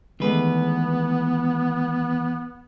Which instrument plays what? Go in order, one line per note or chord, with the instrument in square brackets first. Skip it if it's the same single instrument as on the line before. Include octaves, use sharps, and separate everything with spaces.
[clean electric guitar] E2 B4 [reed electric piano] D#3 G#3 A3 [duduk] B3